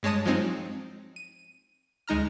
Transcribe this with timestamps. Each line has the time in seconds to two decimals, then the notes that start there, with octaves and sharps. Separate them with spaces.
0.03 G2 G#3 C#5 A5 D#6
0.26 F3 F#3 G#3 C4 D#4
1.16 D#7
2.07 D2 G#3 D#4 A#5 F6